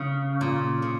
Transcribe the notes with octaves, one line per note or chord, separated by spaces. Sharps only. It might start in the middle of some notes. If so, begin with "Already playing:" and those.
Already playing: C#3
A#2
C#3